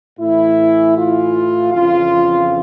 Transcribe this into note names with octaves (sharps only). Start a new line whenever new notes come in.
A2 E3 E4
F4
F2 C#3 E3 F4